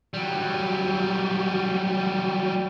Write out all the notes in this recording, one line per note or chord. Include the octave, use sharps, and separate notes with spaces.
F#3 G3